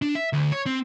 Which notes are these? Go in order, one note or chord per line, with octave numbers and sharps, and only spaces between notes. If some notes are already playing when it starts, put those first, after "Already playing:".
D4
E5
D2
C#5
C4